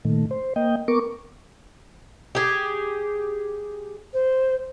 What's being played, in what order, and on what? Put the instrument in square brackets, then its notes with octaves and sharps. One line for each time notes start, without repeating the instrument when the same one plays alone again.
[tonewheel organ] A#2 D#3 A3
C5
A#3 D#5 G5
B3 A#4 C#6 D6
[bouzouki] G4 G#4
[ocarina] C5